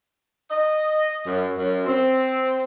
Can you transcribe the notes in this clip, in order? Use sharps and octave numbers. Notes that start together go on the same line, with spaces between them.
D#5
F#2
F#2
C4